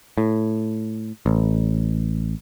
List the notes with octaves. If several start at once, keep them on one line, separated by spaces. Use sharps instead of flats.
A2
A1